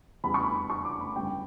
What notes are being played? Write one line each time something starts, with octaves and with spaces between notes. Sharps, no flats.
E2 C#3 G3 B5
C#6
B5
C#6
D6
B5
G1 F#2 C#3 G3 G5